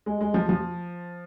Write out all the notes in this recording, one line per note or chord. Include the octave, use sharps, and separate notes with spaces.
G#3
G#3
F3
F3